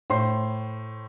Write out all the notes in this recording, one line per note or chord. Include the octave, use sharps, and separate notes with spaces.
A2 C5 C6 C7